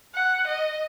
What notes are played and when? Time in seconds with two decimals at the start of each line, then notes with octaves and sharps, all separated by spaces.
0.15 F#5
0.47 D#5